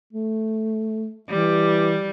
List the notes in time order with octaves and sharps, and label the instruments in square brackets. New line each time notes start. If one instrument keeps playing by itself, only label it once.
[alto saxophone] A3
[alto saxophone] E3 [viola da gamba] G3